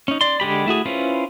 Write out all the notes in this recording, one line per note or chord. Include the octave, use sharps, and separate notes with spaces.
C#4 D#4
D5 C6
D3 G#3 G4 B5
A3 E4 F#4 G#4
C#4 E4 F4 B4 C5